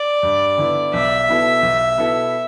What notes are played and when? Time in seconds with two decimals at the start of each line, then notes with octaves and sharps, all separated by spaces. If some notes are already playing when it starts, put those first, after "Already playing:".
Already playing: D5
0.23 G2
0.58 D3 B3 E4
0.93 B1 E5
1.28 B2 B3 E4 A4
1.63 B1
1.97 B2 B3 E4 A4